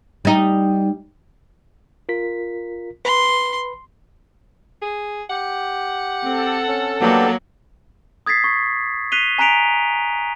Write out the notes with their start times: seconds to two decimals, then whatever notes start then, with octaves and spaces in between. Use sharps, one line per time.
0.25 G3 D#4
2.09 F4 A#4 B6
3.05 B4 B5 C6
4.82 G#4
5.30 G4 F#5
6.23 C4 A4
6.67 C#4
7.01 F#3 A#3 B3 D4 G4
8.26 D#6 G#6 A6 B6 C7
8.44 C#6
9.12 F#6 B6 C7 D#7 F7 G7
9.38 G#5 A#5 F#6 B6 D7 F7